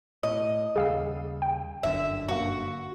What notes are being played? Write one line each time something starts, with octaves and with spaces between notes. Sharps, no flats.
A2 D#5
D#2 C#3 G3 G#4 F5 E6
G5
G1 F#2 D3 E5
G2 A#3 F#4